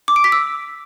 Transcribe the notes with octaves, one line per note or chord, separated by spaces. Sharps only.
D6
D7
B6
E6